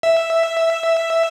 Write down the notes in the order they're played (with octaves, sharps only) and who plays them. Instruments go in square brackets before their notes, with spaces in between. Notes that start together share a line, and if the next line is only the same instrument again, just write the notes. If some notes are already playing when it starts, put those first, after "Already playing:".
[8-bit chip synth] E5